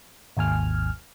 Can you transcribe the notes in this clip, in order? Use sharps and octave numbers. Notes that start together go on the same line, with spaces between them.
G#1 D#2 G#5 F6